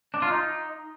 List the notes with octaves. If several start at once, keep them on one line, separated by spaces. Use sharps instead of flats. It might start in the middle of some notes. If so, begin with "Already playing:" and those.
D4
F4
D#4